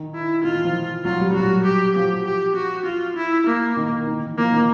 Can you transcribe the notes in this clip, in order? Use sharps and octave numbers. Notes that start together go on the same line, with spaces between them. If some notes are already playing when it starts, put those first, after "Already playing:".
Already playing: D#3
E4
D#3 F4
E3
F3
F#3 F4
G3
G3
F#3 F#4
G4
F3 G4
G4
F#4
F4
E4
A#3
D#3
D#3
E3
F3 A#3
D#3